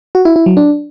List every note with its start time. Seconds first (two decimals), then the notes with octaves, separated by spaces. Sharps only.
0.15 F#4
0.25 E4
0.36 E4
0.46 F#3
0.57 D4